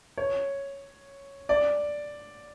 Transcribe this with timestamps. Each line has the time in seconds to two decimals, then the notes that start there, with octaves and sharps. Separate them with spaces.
0.17 C#5
1.49 D5